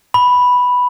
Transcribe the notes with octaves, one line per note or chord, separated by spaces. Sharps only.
B5